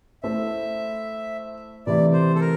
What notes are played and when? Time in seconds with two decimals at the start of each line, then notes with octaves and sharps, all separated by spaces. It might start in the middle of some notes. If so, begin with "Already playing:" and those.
0.23 A3 E4 A4 C5 E5
1.87 C3 E3 A3 E4 D5
2.13 C5
2.35 A4
2.41 A#4